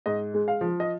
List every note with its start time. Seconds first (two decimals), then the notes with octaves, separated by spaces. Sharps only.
0.06 G#2 D#5
0.34 G#3
0.48 F5
0.61 F3
0.80 D#5